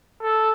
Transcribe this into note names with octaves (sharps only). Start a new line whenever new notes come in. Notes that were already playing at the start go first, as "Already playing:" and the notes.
A4